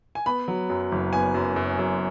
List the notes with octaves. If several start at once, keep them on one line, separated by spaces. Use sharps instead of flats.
G#5
B3 B5
F#3
F#2
F#1
B3 G#5
F#2
F#2
F#2